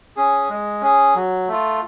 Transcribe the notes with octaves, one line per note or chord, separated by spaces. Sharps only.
C#4 G#4
G#3
C#4 G#4
F#3
A3 F4